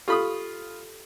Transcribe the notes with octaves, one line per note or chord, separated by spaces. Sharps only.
F4 G4 A4 B5 D#6